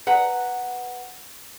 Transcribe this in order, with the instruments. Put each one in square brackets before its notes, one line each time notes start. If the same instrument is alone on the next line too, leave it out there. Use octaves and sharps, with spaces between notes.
[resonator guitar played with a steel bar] B4 F#5 A#5